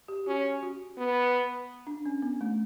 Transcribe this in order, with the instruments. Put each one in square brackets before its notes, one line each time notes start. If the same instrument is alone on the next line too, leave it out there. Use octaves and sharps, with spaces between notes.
[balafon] G4
[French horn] C#4 [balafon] F#4
[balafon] F#4
[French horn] B3
[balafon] D4
C#4
B3
A3